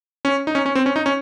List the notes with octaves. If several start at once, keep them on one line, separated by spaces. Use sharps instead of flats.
C#4
D#4
C#4
C#4
C4
C#4
D#4
C#4